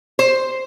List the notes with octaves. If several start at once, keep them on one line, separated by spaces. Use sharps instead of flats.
C5